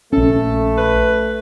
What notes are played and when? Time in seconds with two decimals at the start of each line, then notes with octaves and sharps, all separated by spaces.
0.13 A#1 A3 C#4 A4
0.77 B4